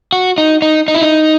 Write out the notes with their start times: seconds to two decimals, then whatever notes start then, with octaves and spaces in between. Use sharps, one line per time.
0.12 F#4
0.38 D#4
0.62 D#4
0.88 D#4
0.95 E4
1.02 D#4